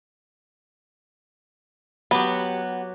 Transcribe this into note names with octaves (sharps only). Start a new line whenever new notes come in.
F#3 B3 F#4 G4